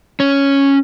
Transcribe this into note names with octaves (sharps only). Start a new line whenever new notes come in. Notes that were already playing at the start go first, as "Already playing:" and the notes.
C#4